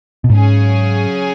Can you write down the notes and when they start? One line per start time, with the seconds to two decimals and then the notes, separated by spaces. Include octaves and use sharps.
0.24 B2
0.29 G#2 C#3 F#3 C#4 G#4